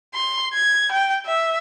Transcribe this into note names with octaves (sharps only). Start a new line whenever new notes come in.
C6
G#6
G5
E5